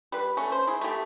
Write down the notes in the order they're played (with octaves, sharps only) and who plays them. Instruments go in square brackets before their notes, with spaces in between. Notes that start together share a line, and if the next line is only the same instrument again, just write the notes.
[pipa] G3 B4
A3 C#4
C5
E4 G#4
A3 G4